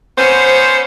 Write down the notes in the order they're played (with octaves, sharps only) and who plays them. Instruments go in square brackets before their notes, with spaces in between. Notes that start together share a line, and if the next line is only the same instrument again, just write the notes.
[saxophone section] B3 C#4 C5